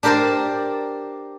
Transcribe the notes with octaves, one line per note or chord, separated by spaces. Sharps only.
D4 G4 A#4 C5 D5